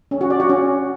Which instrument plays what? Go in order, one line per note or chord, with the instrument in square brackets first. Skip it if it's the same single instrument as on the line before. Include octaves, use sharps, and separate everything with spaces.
[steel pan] C#4
F#4
D5
F#4
C#4